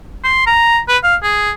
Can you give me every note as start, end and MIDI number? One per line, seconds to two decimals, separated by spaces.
0.24 0.42 84
0.47 0.79 82
0.88 0.97 71
1.03 1.16 77
1.23 1.51 68